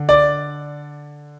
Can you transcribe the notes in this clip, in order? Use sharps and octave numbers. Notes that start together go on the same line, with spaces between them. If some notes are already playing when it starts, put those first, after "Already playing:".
Already playing: D3
D5